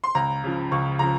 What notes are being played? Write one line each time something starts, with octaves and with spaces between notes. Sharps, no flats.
C6
C#2 A#5
C#3 F3
C#2 C#6
C#3 F3 A#5